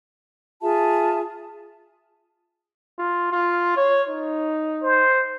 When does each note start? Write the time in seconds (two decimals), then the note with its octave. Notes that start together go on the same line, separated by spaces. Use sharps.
0.61 F4 G#4 E5 A5
2.99 F4
3.32 F4
3.77 C#5
4.09 D#4
4.83 C5